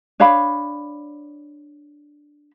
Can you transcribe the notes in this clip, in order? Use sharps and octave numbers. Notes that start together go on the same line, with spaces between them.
D4 C#5 F5 B5